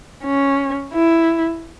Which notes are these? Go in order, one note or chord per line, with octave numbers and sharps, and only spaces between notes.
C#4
E4